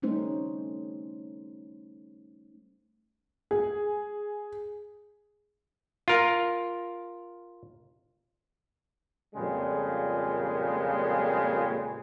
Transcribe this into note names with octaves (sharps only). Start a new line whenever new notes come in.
G3 A3 C#4 D#4 C5
G#4
F4 A#4
F2 A#2 C#3 G3 G#3